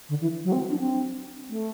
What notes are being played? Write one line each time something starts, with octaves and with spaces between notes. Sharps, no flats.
D3
E3
F#3
C4
D4
C4
A3